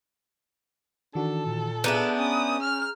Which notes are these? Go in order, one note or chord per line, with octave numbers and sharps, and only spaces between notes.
D#3 E3 D4 F#4 A4
A#2
B3 D4 E4 G#4 A#5 G6
C#4 D#6
F6